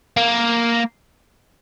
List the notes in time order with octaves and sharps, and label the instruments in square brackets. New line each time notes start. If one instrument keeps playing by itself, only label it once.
[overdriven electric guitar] A#3